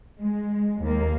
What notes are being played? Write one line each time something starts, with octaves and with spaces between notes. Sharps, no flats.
G#3
D#2 A#3